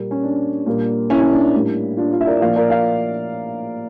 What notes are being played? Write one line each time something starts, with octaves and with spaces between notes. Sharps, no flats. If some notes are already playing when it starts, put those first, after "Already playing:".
Already playing: A#2 G3 A#3
C#4
D4
A#2 G3 A#3
C#4 E4
C#4
D4
A2 G3 A#3
D4 F4
D4 F4
E5
A#4 D5
A#2 F3 A#3 D5 F5
A#4 D5
D5 F5